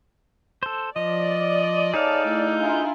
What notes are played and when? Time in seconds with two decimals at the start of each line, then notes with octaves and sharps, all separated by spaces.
0.63 A4 C5
0.96 F3 D5 D#5
1.94 D#4 G#4 A4 C#5 F5 A5
2.24 A3 E4 E6
2.58 D4 E4 F4 G#5 A#5